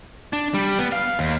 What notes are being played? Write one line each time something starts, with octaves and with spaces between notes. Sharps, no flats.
D4
G3
B3
F5
D#2